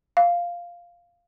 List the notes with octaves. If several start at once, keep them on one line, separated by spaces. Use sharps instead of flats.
F5